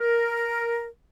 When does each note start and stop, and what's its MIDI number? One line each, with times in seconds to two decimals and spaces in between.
0.01 0.86 70